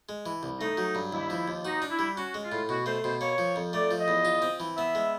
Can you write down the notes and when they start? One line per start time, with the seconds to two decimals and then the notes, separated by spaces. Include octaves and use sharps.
0.09 G#3
0.26 E3
0.43 C2
0.60 A3 D#4
0.78 F#3
0.95 G2
1.13 D#2 E4
1.30 F3
1.48 D#2
1.65 D#4 F#4
1.82 D4
1.91 E4
1.99 G3
2.17 C#4 F#4
2.34 G#3
2.43 F4
2.52 A2
2.69 B2 F#4
2.86 A3 C5
3.04 B2 C5
3.21 A#3 C#5
3.38 F3
3.56 F2
3.73 A3 D5
3.91 F3
4.00 D#5
4.08 E2
4.25 F4
4.42 C4
4.60 E3
4.77 B3 E5
4.95 G#3